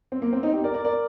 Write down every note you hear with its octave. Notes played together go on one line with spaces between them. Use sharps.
C4
A#3
C4
C4 D#4
D#4 G4
A#4 D5
A#4 D5
A#4 D5